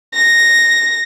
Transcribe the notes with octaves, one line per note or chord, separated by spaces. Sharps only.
A#6